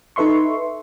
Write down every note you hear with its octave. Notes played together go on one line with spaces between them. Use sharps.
D#4 A4 B4 E5 C6 C#6